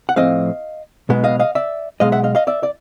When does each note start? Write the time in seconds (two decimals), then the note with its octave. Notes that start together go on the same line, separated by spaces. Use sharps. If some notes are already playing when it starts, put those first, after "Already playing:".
0.09 F#5
0.16 A2 F3 A3 C4 D#5 F5
1.09 B1 B2 G#3 B3
1.24 D#5 F5
1.39 D#5 F5
1.55 D5 E5
2.00 B1 B2 G#3 D#5 F5
2.12 E5 F#5
2.24 D#5 F5
2.35 D#5 F5
2.47 D5 E5
2.63 D5